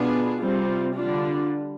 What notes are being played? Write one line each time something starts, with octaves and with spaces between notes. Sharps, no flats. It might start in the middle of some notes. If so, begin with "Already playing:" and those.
Already playing: B2 B3 D4 F4 G#4
C3 G3 C4 F4
D3 G3 D4 F4